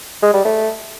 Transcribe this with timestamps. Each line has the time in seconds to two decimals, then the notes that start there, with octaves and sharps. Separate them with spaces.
0.23 G#3
0.34 G3
0.45 A3